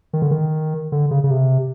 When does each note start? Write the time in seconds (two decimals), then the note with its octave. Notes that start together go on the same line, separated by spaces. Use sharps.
0.13 D#3
0.22 D3
0.31 D#3
0.92 D3
1.11 C#3
1.24 C#3
1.31 C3